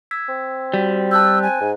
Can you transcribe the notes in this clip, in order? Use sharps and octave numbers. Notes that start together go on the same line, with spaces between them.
E6 G#6 B6
C4
G3 F#4
A5 E6 F#6 G6
G#5
G#2